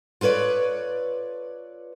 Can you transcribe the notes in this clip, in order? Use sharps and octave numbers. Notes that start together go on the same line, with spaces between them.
F4 A4 B4 C#5 D5